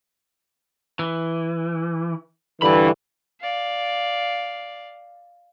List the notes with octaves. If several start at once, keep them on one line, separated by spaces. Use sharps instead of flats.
E3
G2 D3 E3 D4 B5
D5 F5